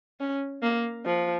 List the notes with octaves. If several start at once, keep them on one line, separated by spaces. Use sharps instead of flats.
C#4
A#3
F3